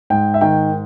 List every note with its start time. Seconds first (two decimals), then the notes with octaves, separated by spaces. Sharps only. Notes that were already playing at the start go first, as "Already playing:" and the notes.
0.10 G#2 G5
0.34 E5
0.41 D#3 G5